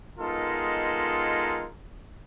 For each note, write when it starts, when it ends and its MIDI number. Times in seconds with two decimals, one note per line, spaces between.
0.17 1.67 56
0.17 1.67 59
0.17 1.67 63
0.17 1.67 65
0.17 1.67 69
0.17 1.67 70